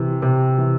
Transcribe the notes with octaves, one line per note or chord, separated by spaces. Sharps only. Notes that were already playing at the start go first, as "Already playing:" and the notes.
Already playing: C3 E3
C3
E3